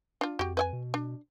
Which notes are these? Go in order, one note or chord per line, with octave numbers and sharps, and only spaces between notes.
D4 F4
F2 F#4 G4
B4 D#5 G#5
B2
D4